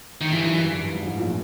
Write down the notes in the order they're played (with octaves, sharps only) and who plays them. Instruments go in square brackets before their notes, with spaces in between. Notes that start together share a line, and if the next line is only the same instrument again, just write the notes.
[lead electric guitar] D#3
[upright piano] G2 [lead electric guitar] E3
[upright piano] F#2
G2
G2
G2
G#1 G#2
A1 A2
A#1 A#2